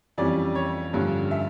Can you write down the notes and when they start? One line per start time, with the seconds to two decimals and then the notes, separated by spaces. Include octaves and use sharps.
0.18 F2 E3 G3 C#4 D5
0.55 C#5
0.93 G2 D3 F3 C#4
1.31 E5